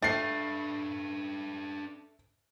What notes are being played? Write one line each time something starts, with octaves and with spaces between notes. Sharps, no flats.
A3 D4 B4 A6 C7